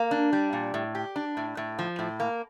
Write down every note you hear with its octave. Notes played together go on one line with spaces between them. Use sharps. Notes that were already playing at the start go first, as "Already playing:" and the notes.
Already playing: A#3
D4
G3
A#2
A2
G4
D4
A2
A2
F3
A2
A#3